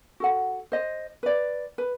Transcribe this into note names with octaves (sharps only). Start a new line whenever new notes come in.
F#4 A4 F#5
C5 D#5
B4 D5
B4